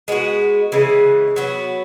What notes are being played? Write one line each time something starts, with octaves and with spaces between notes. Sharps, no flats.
G#3 B3 F#4
C#3 E3 G#3 B3
F#3 B3 F#4